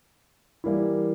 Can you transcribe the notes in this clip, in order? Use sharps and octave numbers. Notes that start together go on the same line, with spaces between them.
E3 G3 A#3 E4